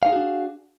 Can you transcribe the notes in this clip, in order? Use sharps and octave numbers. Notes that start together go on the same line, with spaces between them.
D4 D#4 F#4 G#4 F5